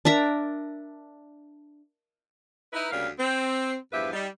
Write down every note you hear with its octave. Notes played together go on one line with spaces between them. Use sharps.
D4 A#4 E5 A#5
D#4 E4 B4
D2 C#3 G3 A#3 F5
C4
E2 G2 F3 G4 B4 E5
G3 D#4